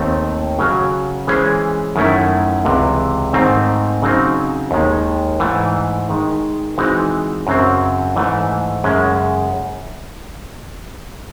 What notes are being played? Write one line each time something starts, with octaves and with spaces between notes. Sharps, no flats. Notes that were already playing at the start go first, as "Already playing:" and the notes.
Already playing: D#2 D#3 A3 C4
C#3 F#3 C#4 F#4
E3 G#3 C#4 G#4 C5
F#2 D#3 A3 C#4 E4
C#2 C3 E3
G#2 D#3 A3 C4
C#3 F#3 C4 D#4
D#2 D#3 G#3
G#2 E3 A3
D#3 G#3 D#4
E3 G#3 C4 D#4 F#4
F#2 C#3 F#3 C4
G#2 E3 A3
F#2 C#3 G#3 C#4